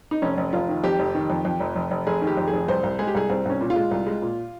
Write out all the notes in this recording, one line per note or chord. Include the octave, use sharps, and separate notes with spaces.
D#4
F1 C#4
F1
F1 F4
D#3
F2 G4
F1
D#3
F2
F2
F1
F1
F1
F1 G#4
D#3
G4
F2
G#4
F1
C2 C5
C2
G#3 G#4
G4
C2 G#4
C2 C4
C2 C#4
A#2
F4
G#3
C2
G#3
A#2